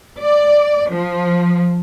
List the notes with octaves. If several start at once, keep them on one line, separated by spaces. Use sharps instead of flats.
D5
F3